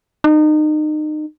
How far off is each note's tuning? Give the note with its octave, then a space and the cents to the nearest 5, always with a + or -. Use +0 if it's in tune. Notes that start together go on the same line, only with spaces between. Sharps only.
D#4 -30